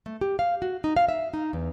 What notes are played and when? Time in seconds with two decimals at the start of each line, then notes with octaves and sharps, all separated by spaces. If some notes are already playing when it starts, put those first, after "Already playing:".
0.06 A3
0.21 G4
0.39 F5
0.62 F#4
0.84 D#4
0.96 F5
1.09 E5
1.34 D#4
1.53 E2